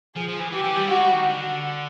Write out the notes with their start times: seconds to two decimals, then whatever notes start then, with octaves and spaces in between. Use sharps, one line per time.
0.16 F3 G#4
0.29 F3
0.40 E3
0.52 E3 G4
0.64 E3
0.76 G3
0.89 G#3 F#4
1.01 G3
1.13 D#3
1.24 D3